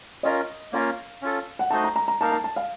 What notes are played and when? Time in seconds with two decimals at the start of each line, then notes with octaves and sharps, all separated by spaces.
0.23 C#4 F4 A#4 D#5
0.73 A#3 C#4 F4 A#4 F5
1.22 C#4 F4 A4
1.59 F#5
1.70 A3 D#4 F#4 C5 D#5 A5
1.84 A#5
1.96 A#5
2.08 A#5
2.21 A#3 D#4 A#4 F5 A5
2.32 A5
2.44 A5
2.56 F5